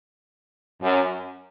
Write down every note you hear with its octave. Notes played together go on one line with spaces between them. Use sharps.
F#2